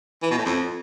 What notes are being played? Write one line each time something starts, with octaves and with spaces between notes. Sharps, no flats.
E3
B2
A2
F2